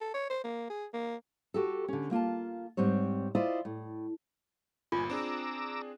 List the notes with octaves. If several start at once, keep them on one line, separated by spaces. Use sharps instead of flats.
A4
C#5
C5
A#3
G#4
A#3
F#4 G4 A4
D3 C#4
A#3 F4 G#5 A5
G#2 G3 C4 C#5
E4 F4 C5 D5 D#5
A2
G1 A#2 F4 G#5
C4 D4 G#4 A#5 D6 E6